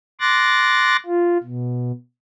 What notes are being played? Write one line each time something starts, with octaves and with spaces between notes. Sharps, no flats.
C6 D6 F#6 A6 A#6
F4
B2